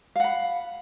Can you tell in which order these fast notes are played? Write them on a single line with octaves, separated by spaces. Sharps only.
F5 F#5 B5